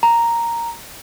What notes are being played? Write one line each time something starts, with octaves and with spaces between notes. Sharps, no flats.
A#5